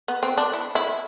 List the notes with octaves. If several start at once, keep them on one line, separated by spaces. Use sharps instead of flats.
B3
C4
D4
E4
E4